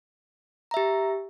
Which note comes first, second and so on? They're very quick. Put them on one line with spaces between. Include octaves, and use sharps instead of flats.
A#5 E5 G4